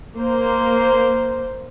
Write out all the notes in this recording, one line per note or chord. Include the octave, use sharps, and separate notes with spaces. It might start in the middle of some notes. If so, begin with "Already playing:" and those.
A#3 C5